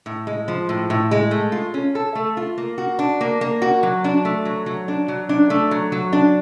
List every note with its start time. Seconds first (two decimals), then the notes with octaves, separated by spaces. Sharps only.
0.06 A2
0.27 G#3
0.48 F3
0.69 A2
0.90 A2
1.11 G#3
1.31 A3
1.52 F4
1.74 C#4
1.95 A4
2.15 A3
2.37 F4
2.58 A#3
2.78 F#4
2.99 D4
3.21 A#3
3.41 A#3
3.62 F#4
3.83 F#3
4.04 D4
4.25 A3
4.45 F#3
4.66 F#3
4.88 D4
5.08 F#3
5.29 D4
5.50 A3
5.71 F#3
5.92 F#3
6.13 D4